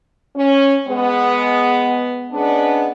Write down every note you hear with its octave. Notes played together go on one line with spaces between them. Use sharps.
C#4
G#3 B3
G#3 B3 C#4 D4